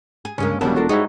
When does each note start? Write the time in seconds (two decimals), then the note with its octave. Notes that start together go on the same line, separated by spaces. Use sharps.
0.25 G#4
0.38 C#2 G2 G#3 A#3 C#4
0.61 E1 D#2 C#3 F#3 G3 E4 A#4 A5
0.76 D4 F4 F#4 A4 A#4
0.89 G#2 G3 D#4 E4 F#4 G#4 C#5